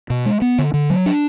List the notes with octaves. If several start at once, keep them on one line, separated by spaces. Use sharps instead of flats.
B2
G#3
B3
D3
D3
F#3
D4